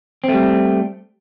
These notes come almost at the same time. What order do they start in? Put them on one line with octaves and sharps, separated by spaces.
C4 A3 G3